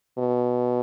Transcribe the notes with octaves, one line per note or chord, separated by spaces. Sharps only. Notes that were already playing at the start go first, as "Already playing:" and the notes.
B2